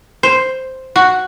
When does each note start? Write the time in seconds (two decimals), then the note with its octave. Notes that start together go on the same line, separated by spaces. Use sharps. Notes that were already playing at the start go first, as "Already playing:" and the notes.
0.23 C5
0.96 F#4